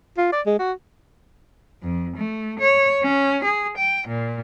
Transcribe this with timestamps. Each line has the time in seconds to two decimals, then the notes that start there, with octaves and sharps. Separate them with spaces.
0.18 F4
0.33 D5
0.47 G#3
0.59 F#4
1.83 F2
2.17 A3
2.60 C#5
3.03 C#4
3.45 G#4
3.77 G5
4.08 A#2